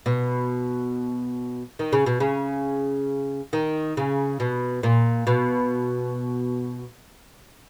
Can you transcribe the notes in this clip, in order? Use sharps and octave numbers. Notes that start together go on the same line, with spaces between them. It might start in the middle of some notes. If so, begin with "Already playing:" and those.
B2
D#3
C#3
B2
C#3
D#3
C#3
B2
A#2
B2